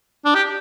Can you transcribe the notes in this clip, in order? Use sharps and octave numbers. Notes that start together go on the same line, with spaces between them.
D4
G4